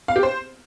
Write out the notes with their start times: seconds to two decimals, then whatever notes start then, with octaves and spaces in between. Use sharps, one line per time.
0.08 F5
0.16 G4
0.23 C5